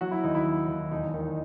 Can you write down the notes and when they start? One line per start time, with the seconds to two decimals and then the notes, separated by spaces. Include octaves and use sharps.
0.01 F#3 F#4
0.11 E4
0.24 D#2 D#4
0.35 E4
0.46 F#3
0.68 D#2
0.91 E1 D#4
1.14 D#3